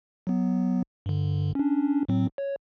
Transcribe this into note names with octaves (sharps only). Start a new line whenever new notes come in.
F#3 B3
G2 D3
C#4 D4
A2 F#3 C4
C#5